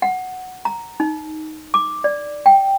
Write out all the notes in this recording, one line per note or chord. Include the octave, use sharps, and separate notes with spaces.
F#5
A#5
D#4
D6
D5
G5